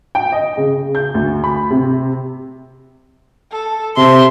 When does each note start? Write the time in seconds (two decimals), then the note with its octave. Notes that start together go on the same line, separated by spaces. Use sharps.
0.15 G5
0.32 D#5
0.57 C#3
0.95 G6
1.14 D2
1.44 B5
1.70 C3
3.52 A4
3.97 C3 E5 C6